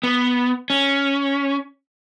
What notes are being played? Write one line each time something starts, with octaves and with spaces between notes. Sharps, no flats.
B3
C#4